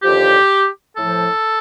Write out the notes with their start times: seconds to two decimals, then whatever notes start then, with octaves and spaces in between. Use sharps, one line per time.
0.03 D#2 D3 F3 G4
0.95 A2 F3 A4